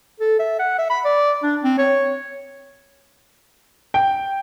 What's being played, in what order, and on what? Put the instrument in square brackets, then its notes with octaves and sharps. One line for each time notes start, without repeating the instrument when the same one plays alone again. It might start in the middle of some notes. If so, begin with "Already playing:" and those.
[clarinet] A4
E5
F#5
E5
B5
D5
D4
C4
C#5
[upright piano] G5